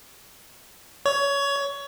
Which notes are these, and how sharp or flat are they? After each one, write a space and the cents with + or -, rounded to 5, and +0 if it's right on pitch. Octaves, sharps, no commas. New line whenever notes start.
C#5 +20